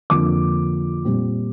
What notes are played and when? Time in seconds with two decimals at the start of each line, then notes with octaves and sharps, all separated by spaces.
0.10 F2 D3 F3 A#3 D6
1.05 A#2 G3 C4